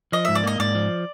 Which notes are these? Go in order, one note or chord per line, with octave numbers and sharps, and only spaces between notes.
F3 D#5
G#2 E5
D5
A#3 D#5
G#2 D5
F3